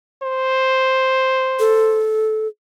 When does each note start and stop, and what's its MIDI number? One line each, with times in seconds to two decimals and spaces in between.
0.22 2.03 72
1.60 2.47 69